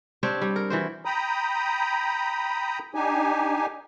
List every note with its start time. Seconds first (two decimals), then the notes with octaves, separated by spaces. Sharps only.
0.23 C4 D4 G4 C#5
0.42 G3
0.56 A#4
0.70 E3 F#4 C5
1.05 G5 A#5 B5 D#6
2.95 D4 D#4 G4 G#5